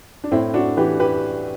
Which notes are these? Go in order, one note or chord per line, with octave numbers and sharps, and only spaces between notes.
D4
A2 C4 E4
D4 F#4
E3 G4 B4
G4 B4